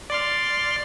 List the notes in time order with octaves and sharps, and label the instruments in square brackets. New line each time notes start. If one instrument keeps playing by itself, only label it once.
[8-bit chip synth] D5 C6 F6